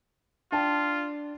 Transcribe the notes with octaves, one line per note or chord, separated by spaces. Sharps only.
D4 F4 G5 A5